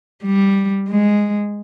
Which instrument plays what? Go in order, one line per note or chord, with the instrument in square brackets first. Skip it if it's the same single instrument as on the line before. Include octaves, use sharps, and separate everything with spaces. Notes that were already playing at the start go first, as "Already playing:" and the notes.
[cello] G3
G#3